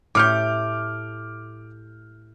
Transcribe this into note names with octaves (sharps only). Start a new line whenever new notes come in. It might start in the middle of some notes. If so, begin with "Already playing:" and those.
A2 A3 G4 D6 F6 G6